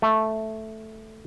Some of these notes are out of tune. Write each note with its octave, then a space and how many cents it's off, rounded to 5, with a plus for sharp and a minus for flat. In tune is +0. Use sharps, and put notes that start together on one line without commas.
A3 -5